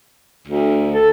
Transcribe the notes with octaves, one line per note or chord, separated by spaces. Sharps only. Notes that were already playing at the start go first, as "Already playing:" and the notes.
D2
A4